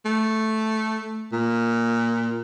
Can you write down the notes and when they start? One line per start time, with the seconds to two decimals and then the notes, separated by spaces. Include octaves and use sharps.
0.05 A3
1.33 A#2